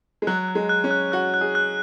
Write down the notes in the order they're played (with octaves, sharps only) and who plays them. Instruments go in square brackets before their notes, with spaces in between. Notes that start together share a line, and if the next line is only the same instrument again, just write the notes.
[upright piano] G#3
[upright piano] F#3 [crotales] F#6
[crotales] F#6
[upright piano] G#3
[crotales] F#6
[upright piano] C#4
[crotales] F#6
[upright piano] F#4 [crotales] F#6
[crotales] F#6
[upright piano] G#4
[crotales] F#6